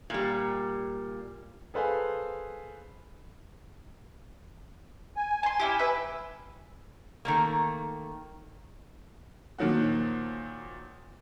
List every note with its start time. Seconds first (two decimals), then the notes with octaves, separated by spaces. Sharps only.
0.10 A#2 G3
1.74 G#4 A4 B4 C5 F5 G#5
5.16 G#5
5.43 A5 C6
5.60 C#4 E4 G4
5.79 B4 E5
7.25 D#3 A3 A#3
9.58 A#2 D#3 F3 F#3 F#4